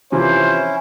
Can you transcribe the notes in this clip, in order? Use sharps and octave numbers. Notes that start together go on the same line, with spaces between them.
C3 E3 F3 C#4 E4 C5